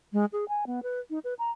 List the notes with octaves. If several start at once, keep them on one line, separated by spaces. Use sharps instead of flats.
G#3
G#4
G#5
B3
B4
D#4
B4
A#5